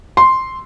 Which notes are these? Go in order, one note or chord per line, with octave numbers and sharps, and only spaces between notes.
C6